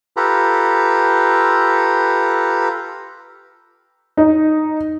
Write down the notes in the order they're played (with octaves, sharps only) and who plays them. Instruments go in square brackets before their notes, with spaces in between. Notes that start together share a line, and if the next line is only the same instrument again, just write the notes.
[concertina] F4 G4 A4 B4 A#5
[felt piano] D#4